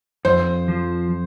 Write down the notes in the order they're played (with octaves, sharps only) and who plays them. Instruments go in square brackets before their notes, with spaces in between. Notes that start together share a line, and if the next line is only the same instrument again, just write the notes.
[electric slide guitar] F2 [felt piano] C5
[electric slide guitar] F3